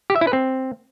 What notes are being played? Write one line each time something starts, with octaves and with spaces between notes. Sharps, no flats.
G4
E5
E4
B4
C4